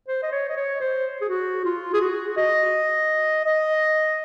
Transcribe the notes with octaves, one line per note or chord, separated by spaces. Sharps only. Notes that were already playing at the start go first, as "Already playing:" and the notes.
C5
D#5
C#5
D#5
C#5
C5
G#4
F#4
F4
G#4
F#4
D#5
D#5